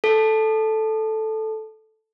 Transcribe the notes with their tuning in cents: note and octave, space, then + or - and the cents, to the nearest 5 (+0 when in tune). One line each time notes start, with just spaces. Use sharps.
A4 -5